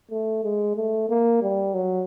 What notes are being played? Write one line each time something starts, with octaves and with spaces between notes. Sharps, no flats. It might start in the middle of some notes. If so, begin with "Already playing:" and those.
A3
G#3
A3
A#3
G3
F#3